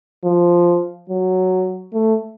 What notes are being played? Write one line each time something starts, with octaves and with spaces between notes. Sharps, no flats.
F3
F#3
A3